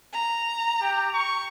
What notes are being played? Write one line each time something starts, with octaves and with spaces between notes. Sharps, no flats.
A#5
G4
C#6